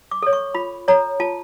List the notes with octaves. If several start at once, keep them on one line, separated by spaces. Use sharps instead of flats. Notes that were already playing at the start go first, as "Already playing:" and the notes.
D6
A4 C#5
C#6
F4 B5
A4 C#5 A#5
F4 A5